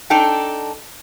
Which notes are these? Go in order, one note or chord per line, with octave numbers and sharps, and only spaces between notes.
D4 D#4 A4 G5